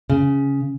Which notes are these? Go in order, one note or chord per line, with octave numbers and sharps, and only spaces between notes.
C#3